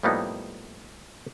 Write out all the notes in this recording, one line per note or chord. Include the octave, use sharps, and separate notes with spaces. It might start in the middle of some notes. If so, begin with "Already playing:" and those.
A2 F3 G3 A#3 B3 D#4